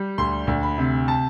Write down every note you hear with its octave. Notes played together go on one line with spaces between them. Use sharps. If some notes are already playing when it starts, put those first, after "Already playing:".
Already playing: G3
D2 C6
D2
B5
C3
A5